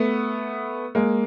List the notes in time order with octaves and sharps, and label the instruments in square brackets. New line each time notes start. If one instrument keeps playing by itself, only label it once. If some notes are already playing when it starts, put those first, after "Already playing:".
Already playing: [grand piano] A3 B3
G#3 A#3